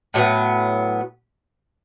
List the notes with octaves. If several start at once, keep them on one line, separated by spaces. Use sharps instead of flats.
A2 F#3 B3